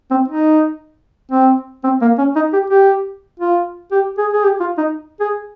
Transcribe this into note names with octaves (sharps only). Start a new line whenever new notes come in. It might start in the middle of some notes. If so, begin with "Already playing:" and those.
C4
D#4
C4
C4
A#3
C#4
D#4
G4
G4
F4
G4
G#4
G#4
G4
F4
D#4
G#4